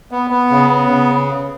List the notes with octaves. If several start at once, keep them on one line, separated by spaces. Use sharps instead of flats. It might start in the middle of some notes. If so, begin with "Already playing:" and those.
B3
B3
C#3
B3
C#3